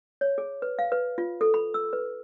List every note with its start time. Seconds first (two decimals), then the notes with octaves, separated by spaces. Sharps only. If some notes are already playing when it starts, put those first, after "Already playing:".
0.21 C#5
0.38 G#4
0.62 B4
0.79 F5
0.92 B4
1.18 F4
1.41 A4
1.54 B5
1.74 E6
1.93 B4